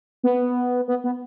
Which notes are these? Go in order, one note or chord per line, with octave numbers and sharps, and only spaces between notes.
B3
B3
B3